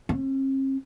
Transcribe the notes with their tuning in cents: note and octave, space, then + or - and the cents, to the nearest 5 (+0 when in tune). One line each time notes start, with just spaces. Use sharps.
C4 +45